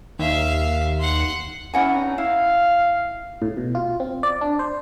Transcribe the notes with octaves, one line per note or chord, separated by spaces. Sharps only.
D#2 E5 F5
F#5 C6
C#4 E4 F#5 G#5
G2 C4 D#4
E4 F5
A2
B2
F4
C4
D5
D4
C5